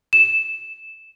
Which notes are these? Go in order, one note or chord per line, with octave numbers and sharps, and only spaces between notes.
E7